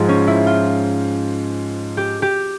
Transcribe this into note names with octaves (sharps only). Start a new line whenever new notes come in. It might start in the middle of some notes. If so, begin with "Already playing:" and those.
Already playing: G#2 F3 G#3
C#4
E4
F4
G4
G4